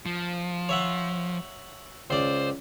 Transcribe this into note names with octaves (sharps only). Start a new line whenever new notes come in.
F3
C#5 E5 F#5
C#2 C5 D5